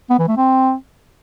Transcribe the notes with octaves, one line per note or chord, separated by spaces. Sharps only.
B3
E3
A3
C4